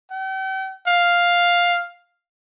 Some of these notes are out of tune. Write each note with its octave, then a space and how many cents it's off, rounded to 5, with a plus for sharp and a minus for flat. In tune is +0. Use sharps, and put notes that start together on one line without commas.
G5 -40
F5 +5